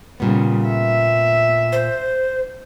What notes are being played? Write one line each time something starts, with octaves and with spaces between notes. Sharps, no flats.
A#2 C#3 G3 B3
E5
C5